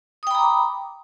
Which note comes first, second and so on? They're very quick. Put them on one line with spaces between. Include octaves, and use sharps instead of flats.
D#6 G5 B5 A#5 D6